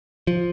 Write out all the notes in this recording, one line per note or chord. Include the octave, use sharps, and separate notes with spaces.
F3